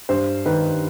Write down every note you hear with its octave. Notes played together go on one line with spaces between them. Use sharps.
G2 C5
D#3 B4